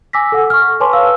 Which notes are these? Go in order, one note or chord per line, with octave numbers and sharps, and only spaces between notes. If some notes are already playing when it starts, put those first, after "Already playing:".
G#5 D6 E6 A#6 B6
A4 F#5
C#6 F6
C#6
B4 C#5 G#5 A5 C6 D6
B4 F5 E6